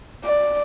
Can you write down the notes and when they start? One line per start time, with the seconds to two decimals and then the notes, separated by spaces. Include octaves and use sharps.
0.24 D5